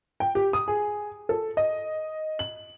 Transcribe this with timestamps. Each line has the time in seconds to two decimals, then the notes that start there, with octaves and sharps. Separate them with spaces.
0.20 G5
0.35 G4
0.53 D#6
0.68 G#4
1.29 A4
1.57 D#5
2.39 F#7